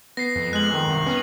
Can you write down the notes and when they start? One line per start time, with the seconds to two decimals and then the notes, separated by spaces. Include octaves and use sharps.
0.17 B3 A#6 C7
0.36 F2
0.53 G#3 F#6 F#7
0.72 D#3
0.90 C2
1.06 B3 C#4